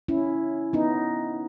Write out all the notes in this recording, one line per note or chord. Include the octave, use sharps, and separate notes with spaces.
C#4 E4
B3 D#4